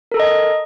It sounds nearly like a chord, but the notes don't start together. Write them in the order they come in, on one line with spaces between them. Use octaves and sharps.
A#4 A4 A#5 D#5